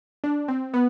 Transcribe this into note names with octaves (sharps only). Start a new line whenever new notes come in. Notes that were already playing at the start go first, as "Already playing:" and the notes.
D4
C4
B3